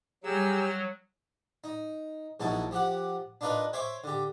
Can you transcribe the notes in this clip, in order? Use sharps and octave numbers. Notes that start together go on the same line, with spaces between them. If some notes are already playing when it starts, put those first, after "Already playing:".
F#3 G3 G4 G#4 A#5 E6 F6
D#4
A#1 B2 F#3 D#4 E4 A5
F3 G4 F#5
D4 D#4 F4 A#4 B4
C5 C#5 E5 G5 D6
D3 G4